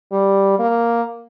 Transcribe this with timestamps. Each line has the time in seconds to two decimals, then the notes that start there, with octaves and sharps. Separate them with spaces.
0.12 G3
0.59 A#3